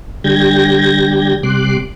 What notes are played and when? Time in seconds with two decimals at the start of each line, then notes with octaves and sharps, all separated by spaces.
0.24 D3 G3 G4 G6 G#6 A#6
1.43 C3 G3 C6 D6 F#6